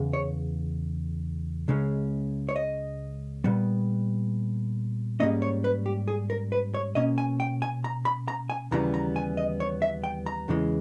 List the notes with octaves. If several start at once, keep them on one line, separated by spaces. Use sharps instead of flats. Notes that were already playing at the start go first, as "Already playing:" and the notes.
Already playing: E2 C#3
C#5
C#2 C#3 G#3 C#4
C#5
D#5
A#2 G3 B3
G#2 G3 A#3 C#4 D#5
C#5
B4
G4
G#4
A#4
B4
C#5
B2 A#3 C#4 D#5
G#5
G5
G#5
A#5
B5
A#5
G#5
D#2 C#3 E3 G3 B3 A#5
A#5
G#5
D#5
C#5
E5
G5
A#5
E2 C#3 E3 G#3